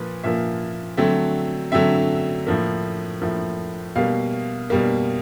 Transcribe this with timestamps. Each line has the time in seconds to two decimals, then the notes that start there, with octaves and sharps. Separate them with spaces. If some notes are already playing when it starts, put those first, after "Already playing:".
Already playing: A#2 F3 A#3 B4
0.24 A#2 F3 A#3 E5
0.97 D3 F#3 A3 C4
1.72 D3 F#3 A3 C4 E5
2.47 A2 F3 A#3
3.22 A2 F3 A#3
3.96 B2 G3 A#3 F5
4.70 B2 G3 A#3